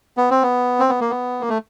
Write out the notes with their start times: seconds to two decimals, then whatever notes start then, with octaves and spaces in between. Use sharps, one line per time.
0.17 B3
0.31 C4
0.43 B3
0.80 C4
0.89 B3
1.01 A#3
1.10 B3
1.41 A#3
1.49 A3